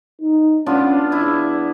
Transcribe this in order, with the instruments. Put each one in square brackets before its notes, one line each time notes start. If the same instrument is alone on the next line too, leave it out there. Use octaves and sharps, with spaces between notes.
[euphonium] D#4
[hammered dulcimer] B3 D4 F4 [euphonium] C#4
[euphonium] E2 [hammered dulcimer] E4